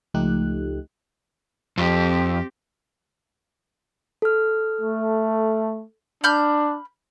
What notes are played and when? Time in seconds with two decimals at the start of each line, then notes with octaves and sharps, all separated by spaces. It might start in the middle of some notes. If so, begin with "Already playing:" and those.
0.14 C#2 F3 A3 D#4 G4 F#6
1.78 F2 C4 G4
4.22 A4 F6
4.79 A3
6.24 D4 B5 F6 G6